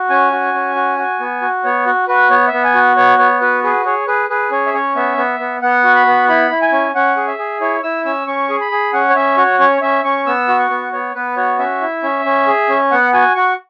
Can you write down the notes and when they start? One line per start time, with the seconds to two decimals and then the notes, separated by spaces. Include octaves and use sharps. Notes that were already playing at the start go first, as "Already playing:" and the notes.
Already playing: F#4
0.10 C#4 G#5
0.32 F#4
0.54 C#4
0.75 F#4
0.98 F#4
1.20 B3
1.42 F#4
1.64 B3 C#5
1.86 F#4
2.08 F#4 B4
2.30 B3 C#5
2.47 E5
2.53 B3
2.64 G#5
2.74 F#4
2.97 B3 C#5
3.18 B3 C#5
3.41 F#4 B4
3.64 G#4 B4
3.85 G#4 C#5
4.07 G#4 B4
4.30 G#4 B4
4.51 C#4 C#5
4.66 E5
4.74 C#4 C#5
4.95 B3 E5
5.17 B3
5.39 B3
5.62 B3 F#5
5.84 F#4
5.95 B5
6.06 B3
6.29 E4 B5
6.51 E4
6.62 G#5
6.72 C#4
6.95 C#4 F#5
7.17 G#4
7.28 E5
7.39 G#4
7.61 E4 C#5
7.83 E4 E6
8.05 C#4 E6
8.27 C#4 C#6
8.50 G#4
8.61 B5
8.71 G#4
8.93 C#4 F#5
9.10 C#5
9.15 C#4 E5
9.37 F#4 C#5
9.59 C#4 C#5
9.82 C#4 E5
10.04 C#4 C#6
10.26 B3 E6
10.48 F#4
10.59 C#6
10.70 B3
10.92 B3 C#5
11.15 B3 B4
11.37 F#4 C#5
11.59 C#4 E5
11.81 E4
12.03 C#4
12.25 C#4
12.47 G#4
12.69 C#4
12.91 B3 F#5
13.13 F#4 G#5
13.35 F#4 C#6